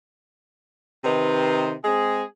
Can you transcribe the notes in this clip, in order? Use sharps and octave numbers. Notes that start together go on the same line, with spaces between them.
C3 D#3 D#4 B4 C5
G#3 C4 G#4